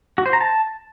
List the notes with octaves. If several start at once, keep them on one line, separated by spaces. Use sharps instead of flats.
F#4
C5
A#5
A5